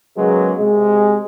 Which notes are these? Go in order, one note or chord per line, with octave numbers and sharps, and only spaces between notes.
C#3 F#3 G#3 A#3 B3
C3 G#3